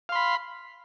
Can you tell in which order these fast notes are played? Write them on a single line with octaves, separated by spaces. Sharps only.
F5 C6 B5